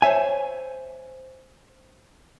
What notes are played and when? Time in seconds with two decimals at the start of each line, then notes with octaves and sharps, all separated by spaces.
0.02 C5 C#5 E5 G#5